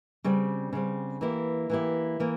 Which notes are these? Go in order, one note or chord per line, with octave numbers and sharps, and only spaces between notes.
C#3 G3 C4
C#3 G3 C4
E3 A#3 E4 G4
E3 A#3 E4 G4
E3 A#3